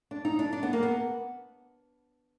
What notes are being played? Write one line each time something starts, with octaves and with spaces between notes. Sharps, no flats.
D4
D#4
D4
D4
B3
A#3
B3